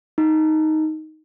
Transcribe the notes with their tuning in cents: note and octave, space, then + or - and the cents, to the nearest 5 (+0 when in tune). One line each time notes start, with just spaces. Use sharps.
D#4 +5